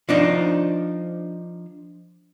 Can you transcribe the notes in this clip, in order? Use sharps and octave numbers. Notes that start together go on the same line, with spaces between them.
F3 D4 D#4